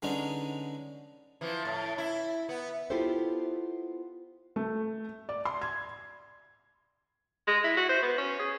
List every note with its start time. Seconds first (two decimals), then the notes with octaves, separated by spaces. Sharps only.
0.02 D3 G#3 B3 C#4 D#4
1.41 E3 F3
1.65 A2
1.98 E4
2.49 B3
2.90 B3 E4 F4 G4 A4 C5
4.56 A3
5.29 D5
5.45 C6
5.62 G#6
7.47 G#3
7.64 E4
7.77 F#4
7.89 C5
8.02 B3
8.18 C#4
8.39 G#4